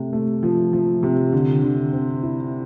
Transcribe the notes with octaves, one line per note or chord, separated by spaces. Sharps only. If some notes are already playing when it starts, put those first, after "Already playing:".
Already playing: C3 A3
A3
F3
F3
C3
D3
D3
C4
E4